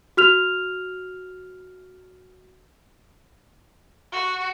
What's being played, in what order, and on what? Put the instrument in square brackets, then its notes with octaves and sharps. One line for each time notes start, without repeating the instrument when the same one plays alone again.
[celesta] F#4 F6 F7
[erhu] F#4